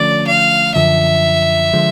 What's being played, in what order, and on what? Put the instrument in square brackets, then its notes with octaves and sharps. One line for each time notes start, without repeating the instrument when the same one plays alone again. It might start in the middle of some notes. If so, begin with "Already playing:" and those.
Already playing: [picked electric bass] D3 F3 A3 C#4 [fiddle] D5
[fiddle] F5
[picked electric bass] F#2 D3 F3 [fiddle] E5
[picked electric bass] D3 F3 G#3